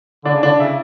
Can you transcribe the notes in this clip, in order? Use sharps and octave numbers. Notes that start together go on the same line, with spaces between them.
D3 D4
C#3
D3 D4
C#3 E4